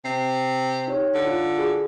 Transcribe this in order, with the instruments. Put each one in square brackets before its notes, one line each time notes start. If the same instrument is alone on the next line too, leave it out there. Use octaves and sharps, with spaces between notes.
[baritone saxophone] C3 [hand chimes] C7
[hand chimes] D#4 G4 C#5
[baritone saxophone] D3
[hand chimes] F4
F#4 G#4